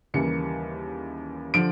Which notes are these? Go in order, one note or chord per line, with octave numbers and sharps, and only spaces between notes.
D#2 C#3 E3 G3 A#3 C#7
D3 F3 D7